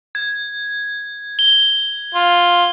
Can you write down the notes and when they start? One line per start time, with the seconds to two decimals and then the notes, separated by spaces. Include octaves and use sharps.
0.15 G#6
1.39 G7
2.14 F4